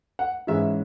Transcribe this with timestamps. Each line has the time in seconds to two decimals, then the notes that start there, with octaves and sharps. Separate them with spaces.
0.19 F#5
0.47 G#2 E3 G#3 C#4 E4 E5